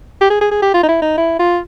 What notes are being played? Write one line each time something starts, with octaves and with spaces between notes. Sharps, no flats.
G4
G#4
G#4
G#4
G4
F4
D#4
E4
D#4
E4
F4